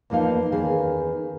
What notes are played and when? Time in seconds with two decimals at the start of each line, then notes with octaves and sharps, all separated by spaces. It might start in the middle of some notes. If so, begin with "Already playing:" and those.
0.10 E2 F3 A#3 D#4 F5
0.52 E2 D#3 C#4 G#4